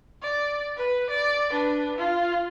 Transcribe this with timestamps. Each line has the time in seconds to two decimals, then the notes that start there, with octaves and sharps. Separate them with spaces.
0.22 D5
0.77 B4
1.10 D5
1.51 D4 B4
1.99 F4